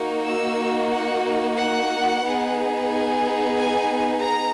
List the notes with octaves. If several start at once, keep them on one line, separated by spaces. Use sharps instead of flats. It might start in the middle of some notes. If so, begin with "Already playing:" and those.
Already playing: A#3 D#4 F#4
E6
F#5
F#5
B3 D#4 G#4
G#5
G#5
A#5